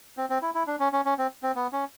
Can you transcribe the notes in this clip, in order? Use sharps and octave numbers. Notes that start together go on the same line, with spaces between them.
C4
C4
E4
E4
D4
C#4
C#4
C#4
C4
C4
B3
C#4